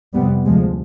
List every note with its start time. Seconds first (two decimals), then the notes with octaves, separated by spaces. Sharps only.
0.14 F2 C3 G3 B3
0.46 D2 C3 F3 G#3